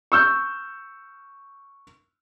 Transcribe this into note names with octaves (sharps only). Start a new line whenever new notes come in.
C#6 E6 G6